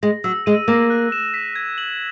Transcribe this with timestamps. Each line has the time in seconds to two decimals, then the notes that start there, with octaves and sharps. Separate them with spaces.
0.03 G#3 A#6
0.24 F#3 E6
0.46 G#3 D#7
0.68 A#3 A#6
0.90 F#6
1.12 E7
1.34 B6
1.56 G#6
1.78 F#7